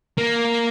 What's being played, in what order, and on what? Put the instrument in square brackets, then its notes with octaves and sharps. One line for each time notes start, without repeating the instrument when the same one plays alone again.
[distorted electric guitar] A#3